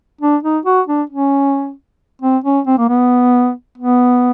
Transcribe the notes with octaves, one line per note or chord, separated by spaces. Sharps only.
D4
D#4
F#4
D4
C#4
C4
C#4
C4
A#3
B3
B3